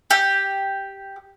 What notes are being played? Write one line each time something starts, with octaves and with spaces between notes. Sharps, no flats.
G4